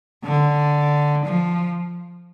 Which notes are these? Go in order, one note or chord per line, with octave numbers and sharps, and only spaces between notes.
D3
F3